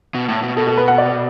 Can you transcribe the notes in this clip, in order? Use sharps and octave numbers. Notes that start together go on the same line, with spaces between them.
B2
A2
B2
B2 A4
A4
B4
F#5
D5